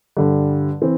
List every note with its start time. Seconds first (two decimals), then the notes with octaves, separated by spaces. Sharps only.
0.17 G2 D3 G3
0.82 E3 C4